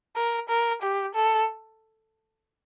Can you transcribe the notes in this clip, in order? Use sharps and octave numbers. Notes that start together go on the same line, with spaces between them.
A#4
A#4
G4
A4